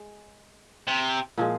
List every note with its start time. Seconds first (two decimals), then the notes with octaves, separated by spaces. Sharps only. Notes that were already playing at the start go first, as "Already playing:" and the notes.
Already playing: G#3
0.87 C3
1.38 A#2 F3 G#3